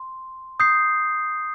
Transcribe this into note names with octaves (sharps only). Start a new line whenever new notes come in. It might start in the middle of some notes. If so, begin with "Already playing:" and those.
Already playing: C6
D#6 G6 C7